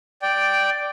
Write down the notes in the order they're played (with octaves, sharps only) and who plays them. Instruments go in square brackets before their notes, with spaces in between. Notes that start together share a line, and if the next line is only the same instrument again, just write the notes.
[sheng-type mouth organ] D5 G5